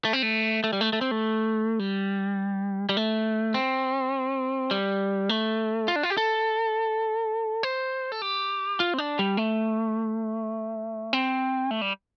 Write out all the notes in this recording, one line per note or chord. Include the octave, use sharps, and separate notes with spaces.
A3
C4
A3
A3
G3
A3
A3
C4
A3
G3
G3
A3
C4
G3
A3
F4
D4
F4
G4
A4
C5
A4
G4
F4
C4
D4
G3
A3
C4
A3
G3